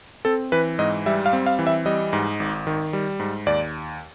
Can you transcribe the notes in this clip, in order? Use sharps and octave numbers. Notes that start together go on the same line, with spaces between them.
C4 A4
E3 B4
G#2 D#5
G3 E5
F5
C4
F5
E3
E5
G3 D#5
G#2
G#1
D#3
G3
G#2
D#2 D5